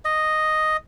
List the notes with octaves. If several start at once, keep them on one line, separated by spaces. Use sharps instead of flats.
D#5